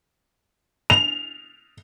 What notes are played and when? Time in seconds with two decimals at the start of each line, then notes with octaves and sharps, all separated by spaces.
0.90 F7